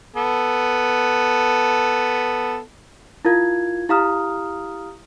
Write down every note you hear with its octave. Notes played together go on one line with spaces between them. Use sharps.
B3 A4
E4 F4 A#4 F5 G#6
E4 G4 F5 A#5 D#6 F6